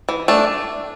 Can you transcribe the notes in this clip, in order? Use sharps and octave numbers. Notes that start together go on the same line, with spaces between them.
E3
A3 D4